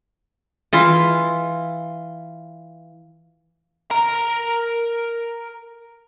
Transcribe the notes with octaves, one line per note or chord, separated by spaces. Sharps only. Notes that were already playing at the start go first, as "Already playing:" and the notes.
E3 F4
A#4 A#5